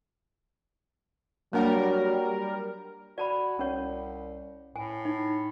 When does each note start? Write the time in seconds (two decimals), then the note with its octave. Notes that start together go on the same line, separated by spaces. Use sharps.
1.53 F#3 G3 A#3 D4 A#4 F#5
3.18 F#4 D5 A5 B5
3.59 C2 C#4 C#5
4.76 A2 G#5
5.05 D#4